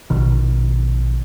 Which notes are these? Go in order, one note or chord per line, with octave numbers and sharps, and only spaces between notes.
A#1 B2 D#3